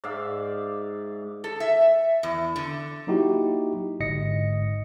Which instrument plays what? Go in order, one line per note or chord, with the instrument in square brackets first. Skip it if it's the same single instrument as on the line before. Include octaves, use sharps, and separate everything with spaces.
[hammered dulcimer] G#2 D5 E5 F5
[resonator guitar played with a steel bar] A4
E5
E2
D3
[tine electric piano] F#3 A#3 D#4 E4 F#4 G4
G#1 G#2 D3 D#5 A#6 C#7